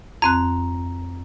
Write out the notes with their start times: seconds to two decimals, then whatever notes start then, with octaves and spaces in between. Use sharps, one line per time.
0.22 F2 C4 A#5 F#6